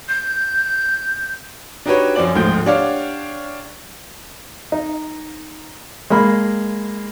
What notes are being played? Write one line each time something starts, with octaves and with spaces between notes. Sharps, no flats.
G6
D4 D#4 F#4 G4 B4 C#5
F#2 F3 C4 C#4 D5 F#7
D1 D2 G#2 F3 G5 G6
D4 G4 C#5 D5 F5 F#5
D#4
G#3 A#3 B5